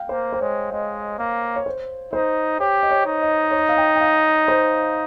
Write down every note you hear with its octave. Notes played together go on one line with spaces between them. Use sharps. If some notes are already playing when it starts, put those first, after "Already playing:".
Already playing: F5 G5
A#3 C5
C5
G#3 C#5
G#3 D#5
A#3 F5
C#5
C5
D#4 C5
G4 C#5
D#5
C#5
D#4
D#5
C#5
D#5
F5
G5
G5
F5
C5